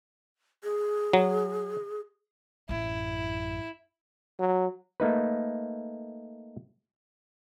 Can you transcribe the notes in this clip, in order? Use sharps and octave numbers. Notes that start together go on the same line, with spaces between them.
G#4
F#3
A1 F#2 E4
F#3
A3 A#3 D#4 B4